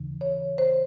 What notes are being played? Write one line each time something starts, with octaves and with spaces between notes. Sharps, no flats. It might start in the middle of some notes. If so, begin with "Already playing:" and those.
Already playing: D#2 C#3 E3
C#5
C5